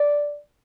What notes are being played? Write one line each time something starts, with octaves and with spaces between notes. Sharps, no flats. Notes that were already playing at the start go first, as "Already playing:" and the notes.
Already playing: D5